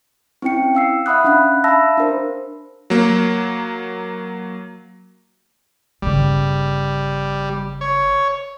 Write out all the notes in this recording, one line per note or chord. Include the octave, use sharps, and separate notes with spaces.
C4 C#4 E4 G5 C#7
F5 E6 C7
E5 F#5 B5 D#6 F#6
C#4 D4 F5 B5 F#6
E5 F5 A5 B5 E6 A#6
D4 A#4 C5
F#3 A#3
G1 C#3 G3
C#5